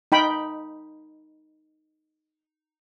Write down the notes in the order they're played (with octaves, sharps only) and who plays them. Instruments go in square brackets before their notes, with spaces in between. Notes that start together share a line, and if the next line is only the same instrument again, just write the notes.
[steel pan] D#4 G5 B5